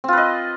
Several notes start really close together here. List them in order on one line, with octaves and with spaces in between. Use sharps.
C4 F4 B4 D#5